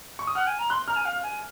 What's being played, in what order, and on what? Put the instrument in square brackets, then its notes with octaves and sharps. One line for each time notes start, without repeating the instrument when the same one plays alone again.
[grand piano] C#6
D#6
[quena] F#5 [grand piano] F6
[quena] G#5
A#5
[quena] C6 [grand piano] F#6
[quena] A#5 [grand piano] F6
[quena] G#5
F5
G#5